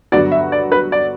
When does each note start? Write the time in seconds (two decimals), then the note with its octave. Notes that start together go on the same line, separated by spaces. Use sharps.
0.12 G2 D3 F#3 B3 F#4 D5
0.32 E5
0.52 D5
0.72 B4
0.92 D5